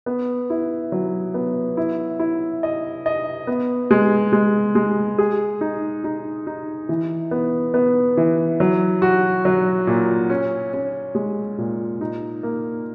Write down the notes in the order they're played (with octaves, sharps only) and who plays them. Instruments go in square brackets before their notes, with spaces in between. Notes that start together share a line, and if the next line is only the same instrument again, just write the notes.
[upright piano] B3
E4
F#3
B3
E4
E4
D#5
D#5
B3
G#3
G#3
G#3
G#4
D#4
D#4
D#4
E3
B3
B3
E3
F#3
F#4
F#3
A#2
C#4
C#4
G#3
A#2
D#4
A#3